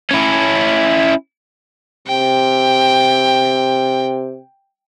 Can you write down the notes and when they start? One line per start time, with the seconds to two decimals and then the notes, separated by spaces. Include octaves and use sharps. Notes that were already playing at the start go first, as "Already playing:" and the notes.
0.11 C#4 E4
2.08 C3 G5